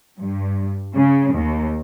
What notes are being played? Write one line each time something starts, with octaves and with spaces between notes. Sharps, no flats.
G2
C#3
D#2